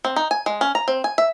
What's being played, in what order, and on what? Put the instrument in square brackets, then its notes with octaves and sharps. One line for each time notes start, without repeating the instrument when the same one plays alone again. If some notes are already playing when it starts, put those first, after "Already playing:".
[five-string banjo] C4
D#4
G#5
G#3
C#4
A#5
C4
G#5
E5